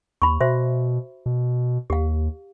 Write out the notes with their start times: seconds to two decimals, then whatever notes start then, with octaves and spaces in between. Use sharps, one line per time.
0.22 D#2 B5 C#6
0.41 B2 F#4 C5 E5
1.26 B2
1.90 D#2 G4 F5